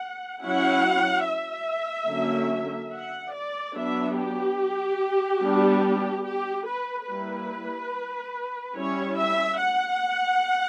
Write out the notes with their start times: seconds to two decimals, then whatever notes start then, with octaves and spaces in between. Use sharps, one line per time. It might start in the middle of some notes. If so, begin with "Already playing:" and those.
Already playing: F#5
0.42 F#3 C#4 E4 F#5
1.25 E5
2.08 D3 F#3 A#3 C#4
2.93 F#5
3.33 D5
3.75 F#3 B3 D4 E5
4.17 G4
5.41 G3 B3 D4
6.25 G4
6.67 B4
7.08 G3 A#3 E4 B4
8.75 G3 C#4 E4 C#5
9.17 E5
9.58 F#5